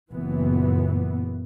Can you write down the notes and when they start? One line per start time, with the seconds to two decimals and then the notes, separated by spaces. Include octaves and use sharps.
0.11 F#1 A#2 E3 B3